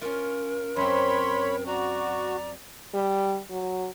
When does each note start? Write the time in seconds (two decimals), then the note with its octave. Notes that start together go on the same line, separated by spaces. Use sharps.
0.02 C#4 F4 A#4
0.76 F#2 C4 C#5 B5 C6
1.66 F#4 D5 A#5
2.94 G3
3.50 F#3